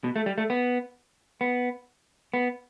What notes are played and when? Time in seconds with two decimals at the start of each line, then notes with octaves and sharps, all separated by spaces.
0.04 B2
0.16 A3
0.26 G3
0.38 A3
0.50 B3
1.41 B3
2.34 B3